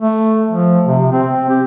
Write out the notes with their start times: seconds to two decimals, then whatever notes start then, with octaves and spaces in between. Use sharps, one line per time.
0.01 A3
0.51 F3
0.85 C3
1.12 C4
1.49 G4